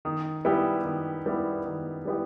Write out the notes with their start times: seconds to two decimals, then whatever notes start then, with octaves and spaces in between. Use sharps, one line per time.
0.05 D#3
0.45 G3 B3 E4 G4
0.85 D#3
1.26 G3 B3 E4 G4
1.66 D#3
2.05 G3 B3 E4 G4